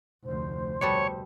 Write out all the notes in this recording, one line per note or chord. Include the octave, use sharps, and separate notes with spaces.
F1 D2 C5
B2 G3 A4 C#5